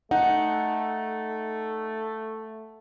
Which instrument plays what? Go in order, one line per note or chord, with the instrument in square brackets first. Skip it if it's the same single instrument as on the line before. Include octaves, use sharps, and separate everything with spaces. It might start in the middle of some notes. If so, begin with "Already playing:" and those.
[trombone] A3 [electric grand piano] D#4 [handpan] F#5